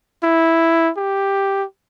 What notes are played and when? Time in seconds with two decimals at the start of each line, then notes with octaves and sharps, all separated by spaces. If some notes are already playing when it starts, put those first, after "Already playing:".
0.23 E4
0.97 G4